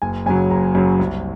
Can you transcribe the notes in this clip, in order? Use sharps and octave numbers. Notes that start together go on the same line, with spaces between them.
F#1 G#5
F#2 C#3 F#3 G#5
F#1 A#5
F#2 C#3 F#3
C2